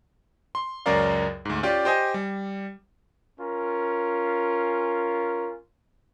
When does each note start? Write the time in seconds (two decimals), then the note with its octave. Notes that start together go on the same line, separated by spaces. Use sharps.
0.55 C6
0.86 C#2 F#2 C#4 A#4 D5 F5
1.45 D2 G#2
1.63 C#4 F4 G4 D5
1.85 G4 C5 D#5 G#5
2.14 G3
3.39 C#4 F4 A#4